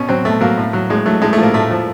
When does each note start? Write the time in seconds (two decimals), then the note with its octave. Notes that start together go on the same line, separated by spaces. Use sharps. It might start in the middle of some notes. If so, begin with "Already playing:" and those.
Already playing: B2 C#4
0.09 F#3 C4
0.25 B2 A3
0.41 F#3 A#3
0.58 A2
0.73 F#3
0.90 A2 G#3
1.06 F#3 A3
1.22 A2 G#3
1.33 A3
1.38 F3 A#3
1.54 A2 A3
1.71 F3